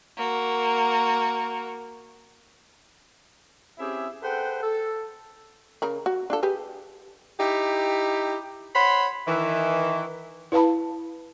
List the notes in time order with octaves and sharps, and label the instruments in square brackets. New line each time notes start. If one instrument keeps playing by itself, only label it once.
[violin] A#3 F#4
[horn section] C4 C#4 E4 G4 G#4 E5
G#4 A4 B4 C5 F#5 G5
A4
[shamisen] C#3 A#4 B5
F#4
D4 F4 A4
G4 G#4 B4
[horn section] D#4 E4 G4
C5 C#5 F#5 B5
D#3 E3
[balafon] E4 B4 F5 A5 B5